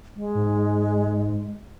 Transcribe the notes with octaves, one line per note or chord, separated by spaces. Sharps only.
G#3
G#2